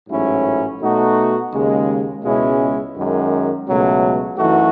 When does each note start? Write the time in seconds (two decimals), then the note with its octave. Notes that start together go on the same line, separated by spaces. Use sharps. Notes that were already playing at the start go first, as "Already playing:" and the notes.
0.09 A1 G#2 F#3 C#4 E4
0.81 B2 A3 D#4 F#4
1.52 D#2 C#3 G#3
2.24 C#2 B2 G#3 C#4 E4
2.95 F#2 D#3 G#3
3.67 C#2 B2 F#3 A3
4.38 F#2 E3 A3 D#4 F#4